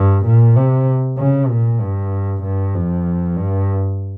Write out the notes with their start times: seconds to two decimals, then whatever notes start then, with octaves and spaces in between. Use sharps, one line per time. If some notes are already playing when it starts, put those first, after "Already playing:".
Already playing: G2
0.25 A#2
0.56 C3
1.18 C#3
1.49 A#2
1.81 G2
2.43 G2
2.75 F2
3.37 G2